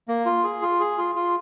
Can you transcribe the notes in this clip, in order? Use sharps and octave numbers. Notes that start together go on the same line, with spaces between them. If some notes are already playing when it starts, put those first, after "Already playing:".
A#3
F4
G#4
F4
G#4
F4
F4